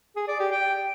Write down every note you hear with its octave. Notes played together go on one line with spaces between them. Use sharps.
G#4
D5
G4
G5